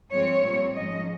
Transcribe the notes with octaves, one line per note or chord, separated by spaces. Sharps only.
G2 F3 G#3 C4 C#5
A#2 G3 C4
G#2 F3 G#3 C#4 D#5